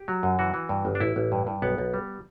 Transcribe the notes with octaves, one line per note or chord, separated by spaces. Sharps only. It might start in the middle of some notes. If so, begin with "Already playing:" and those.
Already playing: G4
F#3
F#2
E3 F#4
E3
G2
G1
D4
A1 E4
A1
G2
G2
B1 B3
B1
G3